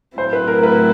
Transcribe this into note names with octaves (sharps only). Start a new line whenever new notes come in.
A2 F#3 A3 C4 E4 C5
B4
A#4
B4